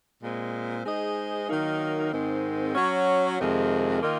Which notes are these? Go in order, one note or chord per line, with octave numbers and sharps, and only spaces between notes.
A#2 G#3 C4
G#3 D#4 G#4 C5 D#5
D#3 F#3 A#3 D#4 A#4
G#2 D#3 G#3 C4
F#3 C#4 F#4 C#5
F2 C3 D#3 G#3
D#3 A#3 F4 A#4 D#5